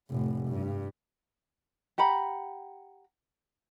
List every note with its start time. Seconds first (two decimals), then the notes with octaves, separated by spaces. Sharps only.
0.10 F1 A2
0.48 G2
1.98 G4 F#5 A#5 B5